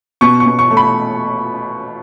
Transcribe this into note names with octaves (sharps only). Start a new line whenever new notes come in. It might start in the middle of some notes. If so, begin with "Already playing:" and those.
B2 C#6
C#6
B2
C#6
A3
B5